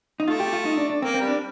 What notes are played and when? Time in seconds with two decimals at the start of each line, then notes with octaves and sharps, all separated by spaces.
0.20 D#4
0.28 A3 F4
0.40 G4
0.53 F4
0.65 D#4
0.77 D4
0.90 D4
1.02 A#3 C4
1.14 C4
1.21 G3
1.28 D4